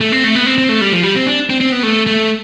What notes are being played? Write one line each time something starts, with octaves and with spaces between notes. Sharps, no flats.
A3
C4
A3
B3
C4
C4
A3
G3
F3
G3
C4
D4
C4
C4
B3
A3
A3